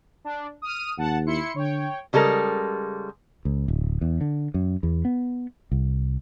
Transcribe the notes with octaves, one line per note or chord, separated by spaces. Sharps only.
D4
D#6 F6 D#7
D#2 F#5 A5
E4 C6 C#7
D3 C#5 G5
C#3 G3 G#3 A4 A#4
C#2
D1
E2
D3
F#2
E2
B3
C2